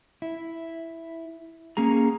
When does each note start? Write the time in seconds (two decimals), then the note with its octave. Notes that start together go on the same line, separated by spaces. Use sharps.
0.22 E4
1.77 A#3 C#4 G#4 A#5